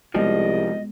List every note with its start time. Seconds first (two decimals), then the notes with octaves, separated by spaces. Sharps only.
0.15 C2 F3 G3 G#3 B3 D#5